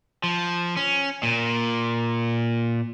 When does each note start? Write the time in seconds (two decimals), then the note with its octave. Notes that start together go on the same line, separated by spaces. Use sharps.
0.24 F3
0.77 C#4
1.23 A#2